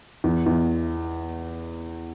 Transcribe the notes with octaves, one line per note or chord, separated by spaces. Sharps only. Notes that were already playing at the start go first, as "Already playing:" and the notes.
E2
E2